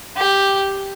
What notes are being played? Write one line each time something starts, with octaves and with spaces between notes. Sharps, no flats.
G4